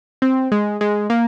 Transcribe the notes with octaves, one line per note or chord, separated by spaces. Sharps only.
C4
G#3
G#3
A#3